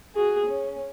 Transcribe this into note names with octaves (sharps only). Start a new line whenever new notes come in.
F#4 G#4
C#4